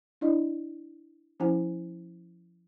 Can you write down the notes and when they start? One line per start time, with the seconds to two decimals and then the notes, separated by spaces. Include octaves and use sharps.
0.21 D4 E4 D5 D#5
1.40 F3 C#4 E4 C5 F#5 G#5